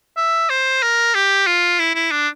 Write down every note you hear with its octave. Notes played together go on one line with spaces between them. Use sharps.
E5
C5
A#4
G4
F4
E4
E4
D4